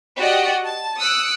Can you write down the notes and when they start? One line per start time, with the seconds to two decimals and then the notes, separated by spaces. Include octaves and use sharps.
0.20 F#4 G4 D5 D#5 F#5
0.65 A5
0.99 D#6 E6 F#6 C#7 D7